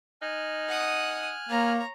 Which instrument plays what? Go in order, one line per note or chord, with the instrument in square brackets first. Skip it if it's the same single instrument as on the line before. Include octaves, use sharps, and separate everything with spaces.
[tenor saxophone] D#4 [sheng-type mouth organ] G#5 F6 F#6
[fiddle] F#5 D#6
[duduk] A#3 [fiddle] C#5 A#5